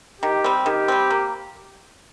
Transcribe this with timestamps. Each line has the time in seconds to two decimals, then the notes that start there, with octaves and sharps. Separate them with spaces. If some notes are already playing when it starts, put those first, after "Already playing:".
0.22 D#3 G4
0.44 G3 C4
0.66 D#3 G4
0.88 G3 C4
1.10 A#3